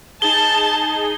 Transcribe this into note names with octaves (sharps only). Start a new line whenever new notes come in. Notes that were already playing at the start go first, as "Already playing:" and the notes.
D#4 G#4 A5 G7